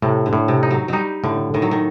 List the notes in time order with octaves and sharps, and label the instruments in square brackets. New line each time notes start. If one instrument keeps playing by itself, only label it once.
[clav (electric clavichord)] A2 [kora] C3
[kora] D3
[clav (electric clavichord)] A2
[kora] C3
[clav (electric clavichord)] D#4
[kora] F#3
[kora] F#3 G3 [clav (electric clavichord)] D#4
[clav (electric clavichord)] A2 [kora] D3
[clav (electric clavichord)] A2 [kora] D#3
[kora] F#3
D#3